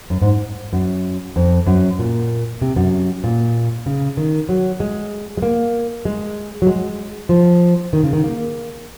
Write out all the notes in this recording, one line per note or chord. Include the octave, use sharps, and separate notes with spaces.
F#2
G#2
F#2
F2
F#2
A#2
C3
F#2
A#2
C#3
D#3
F#3
G#3
G#3
A#3
G#3
F#3
G#3
F3
D#3
C#3
D#3
A#3